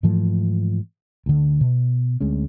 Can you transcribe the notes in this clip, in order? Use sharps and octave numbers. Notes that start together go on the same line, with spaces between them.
G#2 E3 F3 A3
D2 D3
B2
D2 G#3 C#4